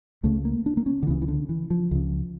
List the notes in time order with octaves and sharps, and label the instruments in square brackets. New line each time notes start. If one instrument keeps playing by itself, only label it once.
[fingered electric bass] C#2 C#3 A3
A#3
D4
A#3
C#4
D3
C#2 C#3 E3
E3
D3
E3
F3
C#2 C#3